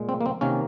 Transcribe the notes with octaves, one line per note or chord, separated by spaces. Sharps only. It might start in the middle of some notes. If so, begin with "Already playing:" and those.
Already playing: A#2 G#3
C4
A#3
C4
C3 D#3 A#3 C#4